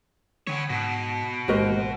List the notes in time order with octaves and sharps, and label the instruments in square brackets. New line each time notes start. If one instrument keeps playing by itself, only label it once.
[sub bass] D3 [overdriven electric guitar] B3 C#5
[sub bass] G#2 [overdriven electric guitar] B2
[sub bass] A1 [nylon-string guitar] D#2 G#2 C5 [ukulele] F#4 A#4 D#5